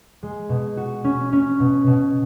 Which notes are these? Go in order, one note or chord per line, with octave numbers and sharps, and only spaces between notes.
G#3
B2
F#4
C#4
C#4
B2
B2